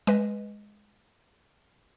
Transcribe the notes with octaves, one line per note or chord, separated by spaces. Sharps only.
G#3 B4 D#5